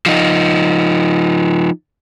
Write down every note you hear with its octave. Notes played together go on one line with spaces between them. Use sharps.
F3 D#4